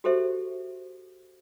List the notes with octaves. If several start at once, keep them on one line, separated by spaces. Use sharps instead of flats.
F#4 G4 A4 C5 E5